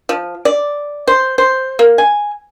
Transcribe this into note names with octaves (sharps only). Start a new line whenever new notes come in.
F3
D5
C5
C5
A#3
G#5